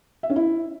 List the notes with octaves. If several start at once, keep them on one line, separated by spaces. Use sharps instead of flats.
E5
C#4
E4